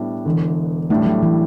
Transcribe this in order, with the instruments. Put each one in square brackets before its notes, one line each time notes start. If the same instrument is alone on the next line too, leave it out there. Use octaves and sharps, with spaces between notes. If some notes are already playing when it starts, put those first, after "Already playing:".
Already playing: [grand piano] A2 G3 D4 [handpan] B3
[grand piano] E1 E2 D3
[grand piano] A1 A2 G3 D4 [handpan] A3
[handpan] F#3
E3